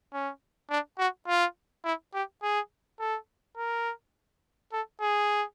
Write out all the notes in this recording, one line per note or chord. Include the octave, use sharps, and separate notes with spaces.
C#4
D4
F#4
F4
E4
G4
G#4
A4
A#4
A4
G#4